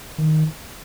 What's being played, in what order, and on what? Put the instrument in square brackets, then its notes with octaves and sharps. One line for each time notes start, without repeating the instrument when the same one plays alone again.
[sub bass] D#3